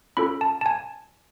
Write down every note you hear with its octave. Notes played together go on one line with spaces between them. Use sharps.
C#4 F4 A4 B5
A5
A5
G#5